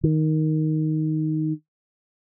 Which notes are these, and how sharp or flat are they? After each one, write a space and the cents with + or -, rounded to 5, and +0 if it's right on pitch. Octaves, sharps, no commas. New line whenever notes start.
D#3 +5